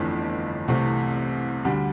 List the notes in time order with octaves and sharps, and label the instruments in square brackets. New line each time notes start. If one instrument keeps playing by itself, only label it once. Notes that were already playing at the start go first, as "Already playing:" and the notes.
Already playing: [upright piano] G1 F2 E3 A3 D4
C2 C3 E3 A3 C4
D2 D3 G3